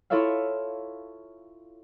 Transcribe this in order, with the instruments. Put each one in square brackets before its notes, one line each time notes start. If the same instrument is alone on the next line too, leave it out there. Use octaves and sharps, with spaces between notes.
[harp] E4 F4 A4 C#5 E5 F5